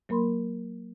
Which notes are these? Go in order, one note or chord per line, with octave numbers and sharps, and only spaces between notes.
F#3 A#3 A#4 B5 C6